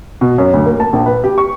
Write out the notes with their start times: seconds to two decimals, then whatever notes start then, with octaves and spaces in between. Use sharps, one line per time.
0.21 B2
0.38 F#2
0.53 D2
0.66 A#3
0.80 A5
0.93 A#1
1.06 B4
1.24 G4
1.38 C#6